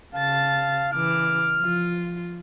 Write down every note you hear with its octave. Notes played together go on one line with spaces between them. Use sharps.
C#3 F5 A5 A6
C#3 E3 D6 F6
F3 F4